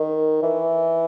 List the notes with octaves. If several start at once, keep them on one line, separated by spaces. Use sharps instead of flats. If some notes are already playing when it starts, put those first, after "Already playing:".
Already playing: D#3
E3